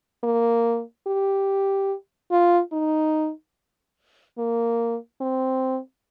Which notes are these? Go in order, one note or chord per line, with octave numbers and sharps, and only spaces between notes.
A#3
G4
F4
D#4
A#3
C4